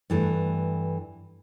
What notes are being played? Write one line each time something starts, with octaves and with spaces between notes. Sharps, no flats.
G2 E3 A3